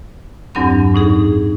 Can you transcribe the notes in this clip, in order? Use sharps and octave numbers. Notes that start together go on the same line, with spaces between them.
E2 G2 F#3 C4 D4 C6
A2 D#4 G#4